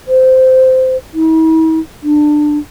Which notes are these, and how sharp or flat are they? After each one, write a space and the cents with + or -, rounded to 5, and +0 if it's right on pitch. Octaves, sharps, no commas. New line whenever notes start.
C5 -15
E4 -45
D4 +20